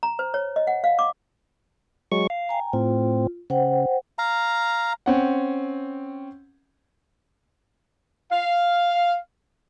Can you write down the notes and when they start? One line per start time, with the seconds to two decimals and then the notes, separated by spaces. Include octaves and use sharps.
0.03 A#5
0.19 C5
0.34 C#5
0.56 D#5
0.67 F#5
0.84 F5
0.99 D6
2.12 F#3 G#3 C#6
2.30 F5
2.49 G5 G#5 A#5
2.73 A2 C4 F4
3.50 C#3 C5 F#5 G5
4.19 F5 A#5
5.06 C4 C#4 F#5
8.32 F5